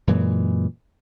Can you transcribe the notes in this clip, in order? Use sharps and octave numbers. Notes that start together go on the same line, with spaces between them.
F#2 A#2 E3 G#3